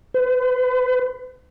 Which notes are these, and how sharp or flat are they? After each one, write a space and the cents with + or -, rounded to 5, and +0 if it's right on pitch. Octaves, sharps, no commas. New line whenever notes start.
B4 +45